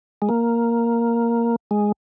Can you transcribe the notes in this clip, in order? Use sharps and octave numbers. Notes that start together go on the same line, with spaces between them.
G#3
A#3
G#3